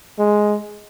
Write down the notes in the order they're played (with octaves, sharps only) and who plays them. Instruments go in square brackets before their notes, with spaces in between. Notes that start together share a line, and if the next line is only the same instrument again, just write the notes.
[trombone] G#3